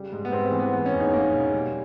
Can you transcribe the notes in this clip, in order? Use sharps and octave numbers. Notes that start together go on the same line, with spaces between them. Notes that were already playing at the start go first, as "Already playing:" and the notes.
Already playing: C#3 G3
G#2
B3
G#2 C4
C4
E3
B3
G#3 B3
C#4
E2
D#4
E2 A#3
B2
G3